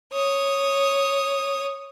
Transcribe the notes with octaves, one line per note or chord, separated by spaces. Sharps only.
C#5 D#6